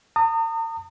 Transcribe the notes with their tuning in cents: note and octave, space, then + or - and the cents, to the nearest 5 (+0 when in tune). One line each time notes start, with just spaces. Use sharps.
A#5 -45 D#6 -20